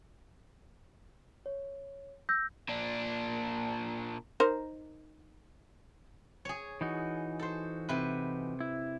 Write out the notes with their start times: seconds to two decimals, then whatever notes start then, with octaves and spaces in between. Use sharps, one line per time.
1.46 C#5
2.29 E6 G6 A#6
2.69 A#2 D4
4.40 D#4 A#4 C5
6.45 G#4 C#5
6.81 E3 D#4 F#4
7.39 A4 C5
7.89 C3 B4
8.60 E4